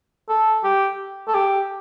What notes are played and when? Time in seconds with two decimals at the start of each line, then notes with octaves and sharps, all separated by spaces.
0.29 A4
0.63 G4
1.28 A4
1.35 G4